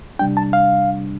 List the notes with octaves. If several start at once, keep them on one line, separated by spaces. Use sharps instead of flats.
C3 G3 D4 G5
A5
F5